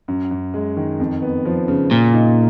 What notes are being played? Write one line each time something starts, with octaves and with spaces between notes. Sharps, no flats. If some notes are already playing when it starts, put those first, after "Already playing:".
F#2
F#2
G#3
D#3
F2
B3
F3
C#3
A#2 C#3
D#4